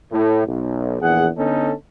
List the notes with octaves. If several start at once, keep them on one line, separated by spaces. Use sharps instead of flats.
A2
B1
A#1 E2 G#4 F#5
D3 B3 C#4 D#4 A4